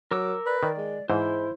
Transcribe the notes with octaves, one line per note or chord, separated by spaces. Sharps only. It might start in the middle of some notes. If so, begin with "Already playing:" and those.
F#3 A#4 D6 E6
B4 D5
D#3 D5
G#3
G#2 E3 G#3 E4 C5